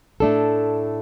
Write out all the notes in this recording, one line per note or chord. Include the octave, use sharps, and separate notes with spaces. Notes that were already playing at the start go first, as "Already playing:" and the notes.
A2 A3 D4 A4